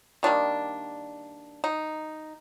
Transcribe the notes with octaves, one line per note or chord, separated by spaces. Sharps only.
D#3 G3 A#3 D4
D#4